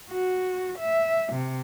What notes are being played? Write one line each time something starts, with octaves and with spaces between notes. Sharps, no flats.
F#4
E5
C3